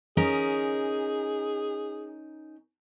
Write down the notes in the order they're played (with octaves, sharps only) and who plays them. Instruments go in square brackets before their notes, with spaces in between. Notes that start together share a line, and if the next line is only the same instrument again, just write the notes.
[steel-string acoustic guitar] C#4 D#4 A#4 [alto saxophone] G#4